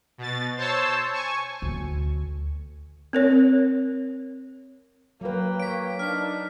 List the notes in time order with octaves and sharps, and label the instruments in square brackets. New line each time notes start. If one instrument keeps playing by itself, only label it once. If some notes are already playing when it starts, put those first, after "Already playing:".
[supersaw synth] B2 A6
C5 C#5 A5 E6
G#5 C#6
[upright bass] D2
[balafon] C4 A#4 C#5
[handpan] F#3 B4 [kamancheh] A#3 G5
[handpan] C#5 [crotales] B6 D7
[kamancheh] D4 D#4 [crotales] F6 B6